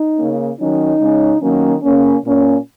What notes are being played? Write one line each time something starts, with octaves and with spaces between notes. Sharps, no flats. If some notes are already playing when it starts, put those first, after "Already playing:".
Already playing: D#4
C#3 A#3 C#4
D#3 F#3 C#4 D#4
C#3 G#3 C#4
D#3 F#3 A#3 C#4
C#3 A#3 C#4
A#2 A#3 C#4